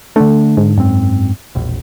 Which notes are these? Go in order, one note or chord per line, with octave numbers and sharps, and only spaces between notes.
D3 A3 D4
G#2
F#2 C4
E1 A#1